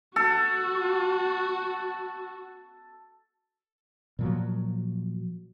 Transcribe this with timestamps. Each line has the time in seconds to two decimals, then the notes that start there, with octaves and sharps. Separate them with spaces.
0.16 F#4 A4
4.19 A#2 F3 F#3